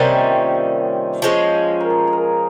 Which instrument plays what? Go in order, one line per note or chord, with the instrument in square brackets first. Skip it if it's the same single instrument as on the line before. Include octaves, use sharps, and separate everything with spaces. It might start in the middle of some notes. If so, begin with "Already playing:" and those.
Already playing: [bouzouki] C3 D#3 G3 C#4 [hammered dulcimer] A#3
[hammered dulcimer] F4
G4
[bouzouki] F3 G#3 C#4
[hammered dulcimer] A#4
G#4
G#4
A#4